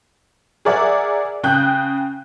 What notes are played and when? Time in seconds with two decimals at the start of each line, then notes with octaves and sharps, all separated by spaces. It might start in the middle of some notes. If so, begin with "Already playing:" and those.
0.65 G#4 A#4 D5 E5 F#5
1.43 C#3 G5 F#6 G6